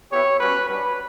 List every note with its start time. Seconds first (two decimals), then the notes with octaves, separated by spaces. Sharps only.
0.11 B3 E4 G4 C#5
0.39 G3 C#4 F#4 B4
0.68 G3 D4 F#4 B4